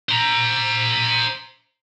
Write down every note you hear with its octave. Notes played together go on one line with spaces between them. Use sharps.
C5 A#5